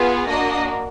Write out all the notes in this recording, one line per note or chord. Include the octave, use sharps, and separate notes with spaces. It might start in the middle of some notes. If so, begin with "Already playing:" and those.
Already playing: B3 F4 G#4
A#3 D4 F#4 D#5